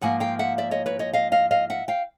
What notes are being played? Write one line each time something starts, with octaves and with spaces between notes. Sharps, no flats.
G#2 F3 A#3 F#5 G#5
F5 G5
E5 F#5
D5 E5
C#5 D#5
B4 C#5
C#5 D#5
D#5 F5
D#5 F5
D#5 F5
E5 F#5
F5 G5